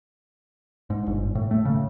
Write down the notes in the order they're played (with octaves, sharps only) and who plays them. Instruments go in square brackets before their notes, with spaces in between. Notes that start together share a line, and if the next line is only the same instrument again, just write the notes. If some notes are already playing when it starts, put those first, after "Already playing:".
[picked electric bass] G#2
G1
A2
A3
C#3